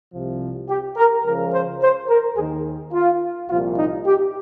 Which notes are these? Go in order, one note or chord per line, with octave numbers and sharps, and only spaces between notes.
C2 C3 F3
G4
A#4
C#2 C#3 F3 A#4
C5
C5
A#4
D#2 D#3 G#4
F4
C2 A#2 F3 F4
D#4
G4